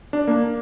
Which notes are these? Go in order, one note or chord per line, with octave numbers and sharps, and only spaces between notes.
D4
A#3